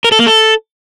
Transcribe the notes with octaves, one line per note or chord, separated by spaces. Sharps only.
A#4
A4
A#3
A4